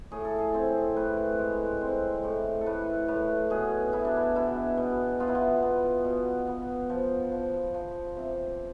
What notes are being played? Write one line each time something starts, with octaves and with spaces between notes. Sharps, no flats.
A2 G#4
A4
G#4
C4
A2 B4
G#3
C4
A2
A4
A2 B4
A2 B4
B2 G#4
B2 E4
D4
E4
B2 E4
B2
B3 F4
E4
F4
B3
B2
B3
F3
F3
F3
C3